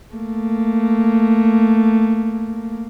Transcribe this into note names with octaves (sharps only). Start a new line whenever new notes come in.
A3 A#3